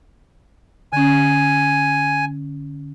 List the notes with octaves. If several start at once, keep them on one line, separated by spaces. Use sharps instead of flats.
D3 C#4 G#5